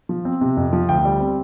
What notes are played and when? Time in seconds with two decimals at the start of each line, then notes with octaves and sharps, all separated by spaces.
0.09 F3
0.25 C4
0.41 C3
0.57 F2
0.73 F3
0.89 D2 G5
1.05 G3
1.20 C4